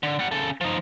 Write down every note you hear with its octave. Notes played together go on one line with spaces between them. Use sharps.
D3
G3 F#5
C#3 A4
F3 D#4